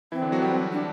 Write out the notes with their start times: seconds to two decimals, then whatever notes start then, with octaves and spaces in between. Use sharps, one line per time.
0.12 E3 C4 E4
0.22 D3 D4
0.32 F#3 F#4
0.42 G3 G4
0.72 D4